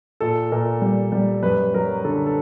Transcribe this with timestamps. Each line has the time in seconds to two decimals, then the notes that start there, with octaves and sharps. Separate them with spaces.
0.21 A#2 A4
0.52 A#2 A#4
0.82 G3
1.12 G3
1.43 F#2 B4
1.74 F#3 A#4
2.05 D3 A4
2.26 A4